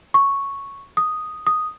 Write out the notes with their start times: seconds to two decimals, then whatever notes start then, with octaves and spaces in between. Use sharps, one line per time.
0.14 C#6
0.97 D#6
1.47 D#6